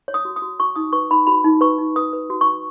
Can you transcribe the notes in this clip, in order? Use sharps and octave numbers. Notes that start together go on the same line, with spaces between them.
C#5
D#6
F#4
D#6
F#4
F#4 C#6
D#4 D#6
B4 C#6
D#4 B5
F#4 B5
D#4
B4 C#6
D#4
B4 D#6
B4
F#4
C#6
F#4